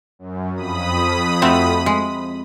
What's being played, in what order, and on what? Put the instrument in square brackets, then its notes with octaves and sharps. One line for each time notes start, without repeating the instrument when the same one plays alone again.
[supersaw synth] F#2
F2 B5 D#6
[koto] A3 C4 F#4
G#3